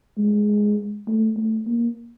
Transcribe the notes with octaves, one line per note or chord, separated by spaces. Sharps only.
G#3
A3
A3
A#3